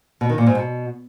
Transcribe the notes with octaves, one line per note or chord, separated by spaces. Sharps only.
B2
D#3
A#2
G#2
B2